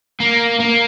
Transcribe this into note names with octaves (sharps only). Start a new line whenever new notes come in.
A#3
A#3